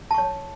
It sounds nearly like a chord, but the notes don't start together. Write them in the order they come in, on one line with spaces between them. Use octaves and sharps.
A5 C#6 C#5